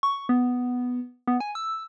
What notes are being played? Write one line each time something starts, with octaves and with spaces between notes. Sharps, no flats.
C#6
B3
B3
G#5
E6